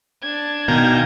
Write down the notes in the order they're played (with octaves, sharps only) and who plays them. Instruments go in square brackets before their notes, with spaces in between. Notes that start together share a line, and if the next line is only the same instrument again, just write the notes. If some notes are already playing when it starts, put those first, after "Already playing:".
[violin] D4 G#6
[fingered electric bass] B2 [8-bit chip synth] D#3 A#5 [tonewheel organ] F5 G#5 G6